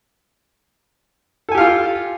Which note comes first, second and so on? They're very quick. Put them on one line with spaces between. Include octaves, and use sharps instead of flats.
A4 G#5 G4 F5 F4